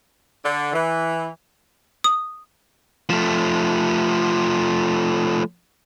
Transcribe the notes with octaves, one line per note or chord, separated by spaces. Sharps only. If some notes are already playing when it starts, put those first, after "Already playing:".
D3
E3
D#6
F3 A3